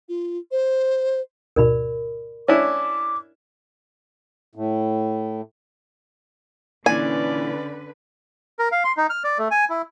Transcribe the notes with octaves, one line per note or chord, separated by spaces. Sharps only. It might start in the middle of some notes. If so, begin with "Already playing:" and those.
F4
C5
D2 G#2 B2 A#4 D5 B5
C#4 D4 E4 D6
A2
A#2 D3 E3 C#4 B4 D5 G#5
A#4
F5
C6
D#4
F6
D5
A3
G#5
E4